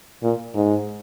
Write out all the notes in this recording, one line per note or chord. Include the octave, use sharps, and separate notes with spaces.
A#2
G#2